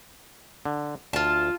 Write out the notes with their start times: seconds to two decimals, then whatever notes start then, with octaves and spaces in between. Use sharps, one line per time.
0.66 D3
1.13 D2 F4 A5